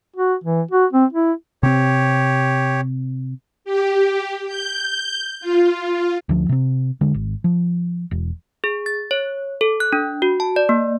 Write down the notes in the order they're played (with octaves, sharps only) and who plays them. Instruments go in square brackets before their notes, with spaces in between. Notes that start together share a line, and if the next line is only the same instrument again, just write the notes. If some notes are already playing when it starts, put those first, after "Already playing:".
[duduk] F#4
E3
F#4
C4
E4
[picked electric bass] C3 C4 [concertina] G4 C#5
[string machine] G4
G6
F4
[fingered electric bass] D2 F3
C3 C4
D3 G#3
G#1
F3
E1
[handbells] G#4
A6
C#5
A4
F#6
D4
F#4
A5
D5
A#3